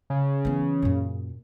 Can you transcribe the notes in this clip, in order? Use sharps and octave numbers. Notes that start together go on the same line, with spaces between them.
C#3
E3 B3
F#2 A#2